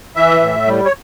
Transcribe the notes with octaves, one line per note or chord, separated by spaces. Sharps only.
E3 E5
A2
G3
C#5